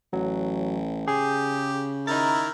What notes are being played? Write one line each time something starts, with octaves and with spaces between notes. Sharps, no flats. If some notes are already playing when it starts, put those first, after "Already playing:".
A1 F#3
C#3 G4 G#4
D#3 D#4 E4 A#4 A6